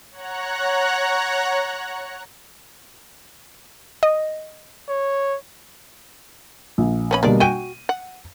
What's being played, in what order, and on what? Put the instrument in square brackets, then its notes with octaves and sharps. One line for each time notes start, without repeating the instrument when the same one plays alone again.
[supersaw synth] C#5 F#5 A#5 F#6
[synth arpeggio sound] D#5
[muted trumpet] C#5
[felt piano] A#1
[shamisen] B3 C#4 B5
[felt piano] B2 G3 A#3 [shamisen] G#3 D4 D5
[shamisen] F#4 G5 G#5 [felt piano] D#7
[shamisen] F#5